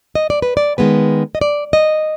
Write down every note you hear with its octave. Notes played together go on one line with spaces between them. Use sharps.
D#5
D5
B4
D5
D#3 G#3 B3 B4
D#5
D5
D#5